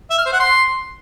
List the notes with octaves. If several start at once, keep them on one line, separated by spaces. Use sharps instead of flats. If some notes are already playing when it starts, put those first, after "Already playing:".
E5
F6
C5
F#5
C6